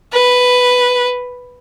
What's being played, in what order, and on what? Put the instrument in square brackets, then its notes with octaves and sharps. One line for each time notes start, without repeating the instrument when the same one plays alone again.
[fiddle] B4